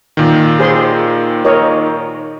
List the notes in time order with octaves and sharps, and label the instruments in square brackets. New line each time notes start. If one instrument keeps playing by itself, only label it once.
[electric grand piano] A#2 D#3
[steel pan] G#4 C5 C6
A#4 C#5 D#5